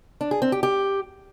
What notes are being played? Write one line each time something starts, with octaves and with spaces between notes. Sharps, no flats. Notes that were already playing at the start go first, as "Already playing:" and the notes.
D4
G#4
C4
G4
G4